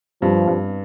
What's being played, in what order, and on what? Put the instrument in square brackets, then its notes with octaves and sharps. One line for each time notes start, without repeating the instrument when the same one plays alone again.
[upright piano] G2 [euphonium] F3
[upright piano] G2